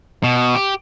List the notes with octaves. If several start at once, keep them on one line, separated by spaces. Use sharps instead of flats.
B2
G4